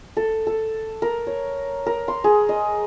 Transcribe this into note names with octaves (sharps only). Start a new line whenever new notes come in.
A4
A4
A#4
C#5
A#4
C6
G#4
D#5